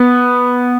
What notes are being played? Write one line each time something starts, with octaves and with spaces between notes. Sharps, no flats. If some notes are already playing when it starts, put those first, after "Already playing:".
Already playing: B3